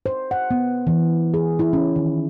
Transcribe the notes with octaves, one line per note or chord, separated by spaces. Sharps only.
C5
F#5
B3
E3
G#4
E4
C#4
D#3